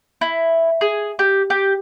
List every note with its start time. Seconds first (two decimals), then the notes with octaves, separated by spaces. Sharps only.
0.21 E4
0.81 G#4
1.19 G4
1.50 G4